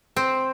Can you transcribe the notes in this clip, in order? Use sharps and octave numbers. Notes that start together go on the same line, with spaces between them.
C4